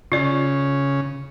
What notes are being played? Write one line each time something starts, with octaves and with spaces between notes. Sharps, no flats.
C#3 F4 D5